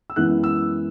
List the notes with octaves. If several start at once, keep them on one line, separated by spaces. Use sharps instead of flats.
E6
F#2 E3 G#3 B3 E4 F#6
E6